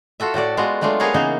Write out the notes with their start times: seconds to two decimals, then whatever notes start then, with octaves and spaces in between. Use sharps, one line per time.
0.20 F4 F#4 A4 E5
0.34 A2 F#4 A4 D5
0.57 G#3 B3 F4 F#4
0.81 F#3 G#3 A3 D4 F4
1.00 B3 G#4 A#4 B4 C#5 F5
1.14 C#3 E3 A#3 B3 D#4